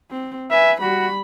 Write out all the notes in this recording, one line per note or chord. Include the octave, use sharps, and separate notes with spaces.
C4
B4 E5 G#5
G3 F#4 B5